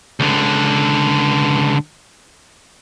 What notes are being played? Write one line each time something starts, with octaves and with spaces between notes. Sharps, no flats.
C#2 D3